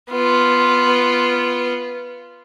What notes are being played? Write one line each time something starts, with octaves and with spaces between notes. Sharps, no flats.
B3 F4